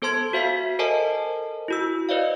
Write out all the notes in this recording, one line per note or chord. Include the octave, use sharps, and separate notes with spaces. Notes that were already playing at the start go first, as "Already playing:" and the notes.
B3 A4 C5 A5 C6 G#6
F#4 C5 E5 F5 B6 C7
A4 A#4 C5 D#5 G#5 A5
E4 F#4 E6
B4 C5 D5 D#5 F5